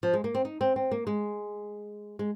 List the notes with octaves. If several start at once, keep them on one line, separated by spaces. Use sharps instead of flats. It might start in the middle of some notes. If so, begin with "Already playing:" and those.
F3
G#3
A#3
C4
D#4
C4
C4
A#3
G#3
G#3